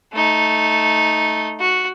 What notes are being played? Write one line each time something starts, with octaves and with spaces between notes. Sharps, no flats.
A3 D#4
F#4